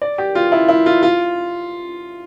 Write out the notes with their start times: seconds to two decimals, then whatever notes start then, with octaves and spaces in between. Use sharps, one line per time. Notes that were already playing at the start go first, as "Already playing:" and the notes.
0.02 D5
0.18 G4
0.35 F4
0.52 E4
0.68 E4
0.86 F4
1.03 F4